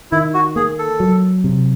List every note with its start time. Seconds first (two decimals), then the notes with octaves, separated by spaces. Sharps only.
0.12 D#3 E4
0.34 F#4
0.56 A#3 G#4
0.79 A4
1.00 F#3
1.44 C3